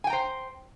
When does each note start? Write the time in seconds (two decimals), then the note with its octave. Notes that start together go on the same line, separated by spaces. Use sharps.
0.04 G#5
0.07 G5
0.10 A#5
0.13 C5